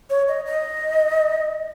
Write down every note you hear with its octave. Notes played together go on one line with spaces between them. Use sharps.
C#5
D#5
D#5